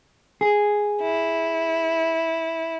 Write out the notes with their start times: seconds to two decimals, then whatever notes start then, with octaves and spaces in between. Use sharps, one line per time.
0.41 G#4
1.02 E4